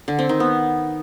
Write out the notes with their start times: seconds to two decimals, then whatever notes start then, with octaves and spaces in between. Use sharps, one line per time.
0.08 D3
0.19 C4
0.29 D#3
0.40 B3